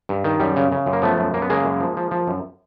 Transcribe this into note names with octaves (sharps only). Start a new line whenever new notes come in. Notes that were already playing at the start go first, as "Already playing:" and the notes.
G2
D#3
F#2 G3
C#3
C#3
F#2
A#3
F3 A3 B3
F#2
F#2 A#3
B3
C#3 G#3 A#3
F#2
F3
F3
F3
F#2